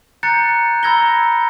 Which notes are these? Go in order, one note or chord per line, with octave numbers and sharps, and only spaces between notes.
A#5 F#6 G6 A6 C#7
A#5 B5 E6 G#6 A#6 G7